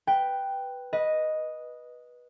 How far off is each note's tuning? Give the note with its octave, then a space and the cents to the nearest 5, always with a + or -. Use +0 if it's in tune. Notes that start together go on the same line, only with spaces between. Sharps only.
B4 +0 G5 +0
B4 -15 D#5 +0